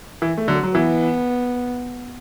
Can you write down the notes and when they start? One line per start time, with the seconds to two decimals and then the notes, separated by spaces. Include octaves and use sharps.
0.22 E3
0.37 A3
0.48 D3 F#3
0.63 F#3
0.74 E3 B3